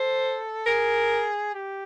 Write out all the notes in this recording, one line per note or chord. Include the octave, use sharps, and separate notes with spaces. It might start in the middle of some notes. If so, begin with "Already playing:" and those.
Already playing: A4 C5
G#4 A#4
G4